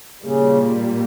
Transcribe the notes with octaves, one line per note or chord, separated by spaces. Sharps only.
A#2 C#3 G3 A#3